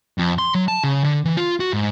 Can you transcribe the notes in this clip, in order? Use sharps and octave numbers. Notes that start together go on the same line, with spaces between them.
F2
C6
F#3
A5
C#3
D3
E3
F4
F#4
G#2